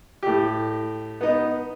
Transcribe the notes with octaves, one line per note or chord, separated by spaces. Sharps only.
A2 G4
B3 D#4